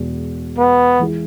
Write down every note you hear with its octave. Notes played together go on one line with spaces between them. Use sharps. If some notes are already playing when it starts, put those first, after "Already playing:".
Already playing: E2 B2 G#3
B3
E3 G#3 E4 G#4